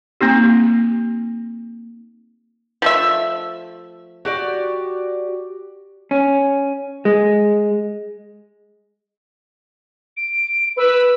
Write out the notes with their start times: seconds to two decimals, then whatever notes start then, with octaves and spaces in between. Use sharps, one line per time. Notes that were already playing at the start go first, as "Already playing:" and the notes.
0.21 A#3 C4 D#4 G4
2.82 F3 A3 E5
4.25 F#4 G4 D5
6.11 C#4
7.05 G#3
10.17 D7
10.78 B4 E6